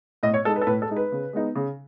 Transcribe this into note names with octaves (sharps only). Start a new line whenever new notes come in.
A2 D#5
C#5
G#3 D#4 A4
B4
A4
A2 B4
A4
G#3 D#4
B4
C#3
G#3 B3 D#4
C#3